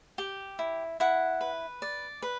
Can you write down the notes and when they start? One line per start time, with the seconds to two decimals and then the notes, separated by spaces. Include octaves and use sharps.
0.18 G4
0.59 E4
1.00 E4 F#5
1.41 B4
1.82 D5
2.22 B4